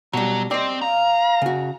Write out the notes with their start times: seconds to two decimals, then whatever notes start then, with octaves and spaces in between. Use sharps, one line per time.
0.13 B2 F#3 G3
0.51 C4 D5 D#5
0.81 F5 A#5
1.42 C#3 F#4